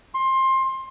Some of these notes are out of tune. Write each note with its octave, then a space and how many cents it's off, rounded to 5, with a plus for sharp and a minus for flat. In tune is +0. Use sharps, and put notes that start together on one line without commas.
C6 +20